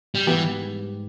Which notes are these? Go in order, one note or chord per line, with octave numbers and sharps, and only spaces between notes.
G3
G#2 E3 G3 B3 G4